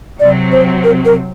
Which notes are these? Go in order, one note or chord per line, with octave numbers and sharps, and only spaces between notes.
C3 F#3 C4 D5
C5
A#4
A#4